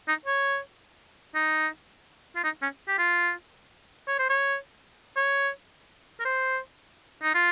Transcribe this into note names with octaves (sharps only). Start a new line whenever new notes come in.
D#4
C#5
D#4
F4
D#4
C#4
G4
F4
C#5
C5
C#5
C#5
A#4
C5
D#4
F4